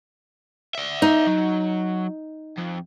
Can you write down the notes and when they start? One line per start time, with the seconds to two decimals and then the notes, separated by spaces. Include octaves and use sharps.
0.75 D5 E5
1.02 D#4
1.27 F#3
2.58 F2